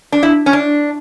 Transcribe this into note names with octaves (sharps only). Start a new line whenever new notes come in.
D4
E4
C#4
D4